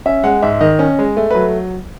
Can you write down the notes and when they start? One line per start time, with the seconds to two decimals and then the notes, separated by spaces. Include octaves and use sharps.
0.06 C#4 E5
0.23 G#3 F#5
0.42 G#2 E5
0.61 D#3 D#5
0.79 C#4
0.99 G#3
1.17 A3
1.31 F#3 B4